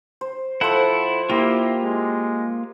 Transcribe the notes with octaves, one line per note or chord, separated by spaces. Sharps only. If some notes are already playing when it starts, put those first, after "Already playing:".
C5
F3 E4 A4 C5 F#5
A#3 E4 F4 G4
G#3